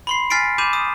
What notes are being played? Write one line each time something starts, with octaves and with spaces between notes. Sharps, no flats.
B5 C6 C7
G#5 F6 A6 B6 C7 D7
B5 D6 G6 D#7 E7
D#6